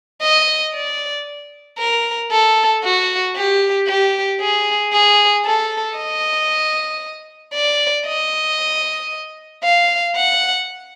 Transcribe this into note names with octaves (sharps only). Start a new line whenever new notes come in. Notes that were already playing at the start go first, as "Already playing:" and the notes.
D#5
D5
A#4
A4
F#4
G4
G4
G#4
G#4
A4
D#5
D5
D#5
F5
F#5